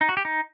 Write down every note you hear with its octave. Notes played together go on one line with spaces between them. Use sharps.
D#4
F#4
G4
D#4